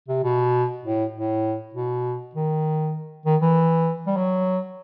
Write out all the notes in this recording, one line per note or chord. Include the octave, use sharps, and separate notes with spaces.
C3
B2
A2
A2
B2
D#3
D#3
E3
G3
F#3